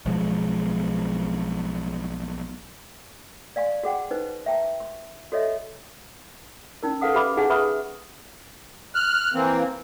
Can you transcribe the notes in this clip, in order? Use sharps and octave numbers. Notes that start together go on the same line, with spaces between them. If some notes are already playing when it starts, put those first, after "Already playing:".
B1 B2 F3 G#3
D5 F5 G#5 C6
F#4 G#4 F#5 G5
D#4 B4 C5
E5 G5 A5 A#5
C6
F#4 A4 C#5 D#5 E5
C#4 D#4 A#4
A4 B4 F5 F#5 D#6
G4 B4 E5 B5 D6
D#4 G4 G#4 F#5 G#5
B4 E5 F#5 B5 C#6 D#6
F6 F#6
E3 A#3 C4